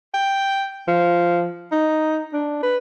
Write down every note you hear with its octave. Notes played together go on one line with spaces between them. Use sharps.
G5
F3
D#4
D4
B4